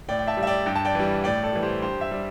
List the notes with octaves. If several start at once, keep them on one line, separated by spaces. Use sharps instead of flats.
A2 D5 G5
G5
E5 A5
G3
E5
D5 G5
G2 G5
A5
D5 G5
E3 G3
A2 D5 G5
A4 D5
E3 G3
G4 C5
G2 G4 C5
C5 E5
G3